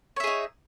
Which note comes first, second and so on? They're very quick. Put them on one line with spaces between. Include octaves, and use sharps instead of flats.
C#5 E5 G#4 D#4